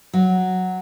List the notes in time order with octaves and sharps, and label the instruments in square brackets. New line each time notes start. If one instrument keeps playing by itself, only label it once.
[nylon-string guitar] F#3